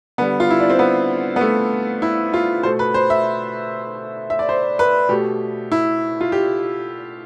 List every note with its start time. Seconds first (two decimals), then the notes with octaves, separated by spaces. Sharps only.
0.18 D3 G3 B3
0.40 F4
0.50 E4
0.60 D4
0.69 C4
0.79 B3
1.36 B3
1.41 A3
2.02 E4
2.34 F4
2.63 B2 A3 C5
2.79 B4
2.94 C5
3.10 E5
4.30 E5
4.39 D5
4.49 C5
4.79 B4
5.09 B2 A3 G4
5.72 E4
6.21 F4
6.32 G4